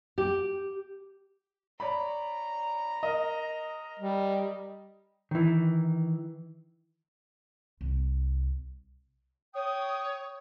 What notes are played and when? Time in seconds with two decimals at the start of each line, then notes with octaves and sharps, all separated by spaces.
0.18 G4
1.80 C#5 D5 A#5 B5
3.03 A#4 D#5
3.99 G3
5.31 D#3 E3
7.81 C2
9.54 C#5 G5 D#6